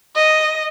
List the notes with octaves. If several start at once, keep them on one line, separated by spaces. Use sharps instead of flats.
D#5